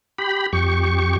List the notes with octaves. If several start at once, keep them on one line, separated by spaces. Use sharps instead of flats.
G4 B5
F2 G4 C#6